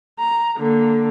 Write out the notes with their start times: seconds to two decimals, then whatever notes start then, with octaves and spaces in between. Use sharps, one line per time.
0.19 A#5
0.58 D3 A#3